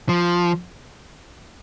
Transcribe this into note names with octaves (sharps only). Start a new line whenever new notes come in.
F3